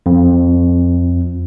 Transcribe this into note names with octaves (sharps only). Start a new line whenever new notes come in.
F2